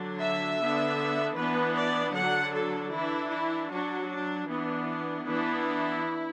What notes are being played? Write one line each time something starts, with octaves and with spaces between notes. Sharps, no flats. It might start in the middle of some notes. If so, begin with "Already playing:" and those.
Already playing: D3 F#3 D4
E5
D3 B3 D4
E3 B3 D4 B4
D5
D3 F#3 D4 F#5
A4
E3 D4 E4
E4
F#3 D4 F#4
D4
E3 B3 D4
E3 B3 D4 E4